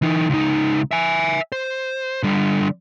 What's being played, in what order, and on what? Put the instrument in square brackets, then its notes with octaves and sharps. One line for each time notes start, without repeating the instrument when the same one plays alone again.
[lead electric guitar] E3 D#4
C#2 D#4
E5 G#5
C5
D3 G3